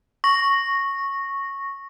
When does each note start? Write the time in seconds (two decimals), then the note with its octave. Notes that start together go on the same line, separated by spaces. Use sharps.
0.24 C#6 A#6